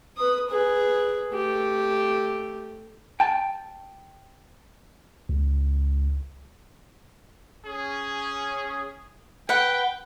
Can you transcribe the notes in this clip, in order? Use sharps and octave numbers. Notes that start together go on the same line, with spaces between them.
B4 D#6
G#4 B4
A3 G4
G5 A5
C#2
C#4 G#4
B4 F#5 G5